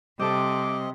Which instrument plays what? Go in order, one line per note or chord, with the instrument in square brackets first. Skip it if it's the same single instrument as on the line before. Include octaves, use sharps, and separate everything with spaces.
[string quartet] C3 [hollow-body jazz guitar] G3 A4 [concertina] C4 D#5 [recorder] D6